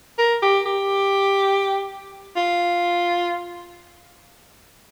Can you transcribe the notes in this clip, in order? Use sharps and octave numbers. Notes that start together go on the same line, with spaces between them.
A#4
G4
G4
F4